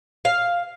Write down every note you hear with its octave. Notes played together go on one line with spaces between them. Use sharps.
F5